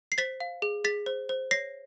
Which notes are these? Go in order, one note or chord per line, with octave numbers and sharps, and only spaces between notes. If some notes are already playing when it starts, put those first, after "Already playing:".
C7
C5 A6 B6
F5
G#4
G#4 A6 B6
C5
C5
C#5 A#6 C7